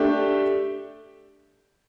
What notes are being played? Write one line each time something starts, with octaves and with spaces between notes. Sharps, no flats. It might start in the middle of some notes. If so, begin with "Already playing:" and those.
Already playing: A3 D4 G4